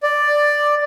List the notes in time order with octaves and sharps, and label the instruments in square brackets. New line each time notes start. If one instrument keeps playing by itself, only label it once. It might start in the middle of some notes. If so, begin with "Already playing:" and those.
[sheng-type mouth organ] D5